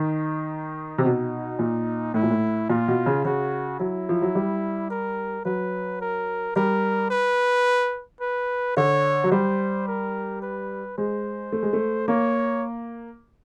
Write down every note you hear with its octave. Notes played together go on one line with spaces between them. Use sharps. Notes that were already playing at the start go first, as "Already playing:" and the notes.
Already playing: D#3 D#4
C3
B2
A#2
A2 E4
A#2
A2
A#2 F4
B2
C#3
C#3 F#4
F#3 E4
F3
F#3
G3
A#4
F#3 B4
A#4
G3 A#4
B4
B4
D3 C#5
F#3
G3 C5
A#4
B4
G#3 C5
A3
G#3
A3
A#3 C#5